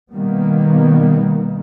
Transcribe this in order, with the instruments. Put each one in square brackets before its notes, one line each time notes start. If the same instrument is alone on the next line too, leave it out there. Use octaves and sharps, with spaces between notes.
[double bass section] B2 D#3 G3 A#3 B3